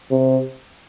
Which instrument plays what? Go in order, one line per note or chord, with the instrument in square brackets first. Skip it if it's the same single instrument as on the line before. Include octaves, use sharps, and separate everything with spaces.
[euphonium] C3